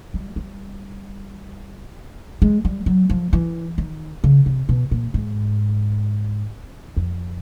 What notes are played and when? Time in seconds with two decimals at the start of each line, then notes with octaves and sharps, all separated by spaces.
0.14 G3
0.36 G3
2.42 G#3
2.65 G3
2.86 F#3
3.10 F3
3.33 E3
3.78 D#3
4.24 C#3
4.46 C3
4.69 B2
4.91 A#2
5.14 G#2
6.97 F2